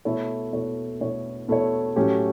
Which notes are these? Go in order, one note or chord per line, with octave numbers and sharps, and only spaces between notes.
B2 A3 E4 A4 C#5
B2 A3 E4 A4 C#5
B2 A3 E4 A4 C#5
B2 A3 E4 A4 C#5
A2 F#3 A3 C#4 G4